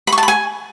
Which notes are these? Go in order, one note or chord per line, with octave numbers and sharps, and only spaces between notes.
B5
C#6
A5
B5
G#5